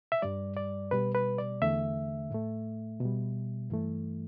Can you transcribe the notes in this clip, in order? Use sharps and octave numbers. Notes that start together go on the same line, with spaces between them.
E5
G2 G3 D5
D5
B2 G3 B4
B4
D5
E2 D3 A3 E5
A2 A3
B2 G3
G2 E3 A3